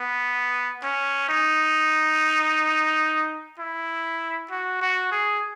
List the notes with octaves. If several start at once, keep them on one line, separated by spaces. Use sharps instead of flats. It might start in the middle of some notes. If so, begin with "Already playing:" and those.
Already playing: B3
C#4
D#4
E4
F#4
F#4
G#4